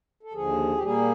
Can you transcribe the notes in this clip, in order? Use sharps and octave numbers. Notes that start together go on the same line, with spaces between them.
A4
D#2 D3 F3 G#4
G4
A#2 G3 A#3 G#4